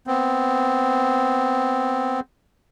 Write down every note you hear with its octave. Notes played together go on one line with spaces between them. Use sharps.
B3 C4